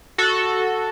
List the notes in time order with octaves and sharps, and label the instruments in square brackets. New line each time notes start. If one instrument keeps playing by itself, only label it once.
[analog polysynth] F#4 A4